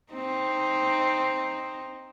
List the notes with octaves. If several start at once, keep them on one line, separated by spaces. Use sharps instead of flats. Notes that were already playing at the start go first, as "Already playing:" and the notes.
C4 D#4